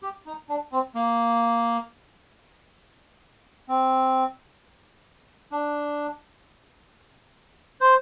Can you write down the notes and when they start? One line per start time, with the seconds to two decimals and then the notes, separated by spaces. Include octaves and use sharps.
0.03 G4
0.26 D#4
0.49 D4
0.72 C4
0.95 A#3
3.69 C4
5.52 D4
7.81 C5